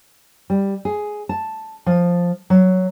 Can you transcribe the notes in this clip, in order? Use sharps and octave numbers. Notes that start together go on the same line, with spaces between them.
G3
G#4
A5
F3
F#3